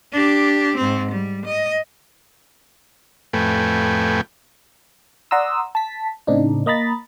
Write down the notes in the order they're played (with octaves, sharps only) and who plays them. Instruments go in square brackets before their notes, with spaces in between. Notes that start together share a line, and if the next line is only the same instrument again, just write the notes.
[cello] D4 G4
G#2 C4
G3
D#5
[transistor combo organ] F2 A2 A3 B4 G5 G#5
[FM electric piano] D5 F#5 A#5 C6 D#6 E6
A5 B6
A2 C#3 C4 D4 D#4
A#3 D#5 A#5 B5 A6